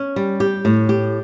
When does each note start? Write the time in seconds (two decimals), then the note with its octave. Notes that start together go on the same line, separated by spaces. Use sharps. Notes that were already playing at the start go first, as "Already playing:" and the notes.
Already playing: C#4
0.16 G3
0.40 G4
0.65 A2
0.89 G4